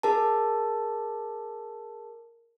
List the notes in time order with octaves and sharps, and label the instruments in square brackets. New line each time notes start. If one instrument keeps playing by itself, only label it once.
[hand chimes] G#4 A#4 A5